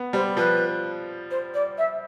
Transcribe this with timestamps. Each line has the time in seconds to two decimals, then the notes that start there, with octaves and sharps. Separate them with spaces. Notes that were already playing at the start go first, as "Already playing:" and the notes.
Already playing: B3
0.13 G3 C5
0.37 F3 B4
1.31 C5
1.54 D5
1.78 E5